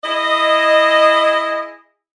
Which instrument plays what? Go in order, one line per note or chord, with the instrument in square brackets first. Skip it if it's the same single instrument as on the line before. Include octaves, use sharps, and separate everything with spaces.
[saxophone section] E4 G#4 D#5